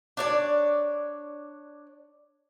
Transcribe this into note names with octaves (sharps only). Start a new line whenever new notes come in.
D4 C#5 D5